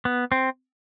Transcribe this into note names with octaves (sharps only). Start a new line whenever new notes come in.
B3
C4